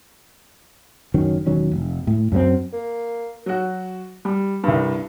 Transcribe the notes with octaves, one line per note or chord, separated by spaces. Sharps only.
F#1 D#3 F#3 C#4
E1 D#3 F#3 C#4
F1
A2
F#2 F#3 A3 C4
A#3
F#3 F#4
G3
C2 G2